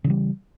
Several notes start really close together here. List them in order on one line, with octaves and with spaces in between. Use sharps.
C#3 E3 G3